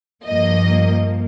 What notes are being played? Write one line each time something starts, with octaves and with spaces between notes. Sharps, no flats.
G2 F3 A#3 D#5